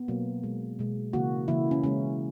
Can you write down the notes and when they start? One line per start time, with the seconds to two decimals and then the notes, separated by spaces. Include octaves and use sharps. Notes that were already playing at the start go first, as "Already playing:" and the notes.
Already playing: B3
0.08 B2 F#3 A#3
0.43 B2 G#3
0.79 B2 G#3
1.13 C#3 E3 A#3 F#4
1.48 C#3 E3 A#3 E4
1.71 C#4
1.83 C#3 G#3 C#4